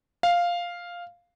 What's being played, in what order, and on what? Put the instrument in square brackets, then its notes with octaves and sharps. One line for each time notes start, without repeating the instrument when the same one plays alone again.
[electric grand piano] F5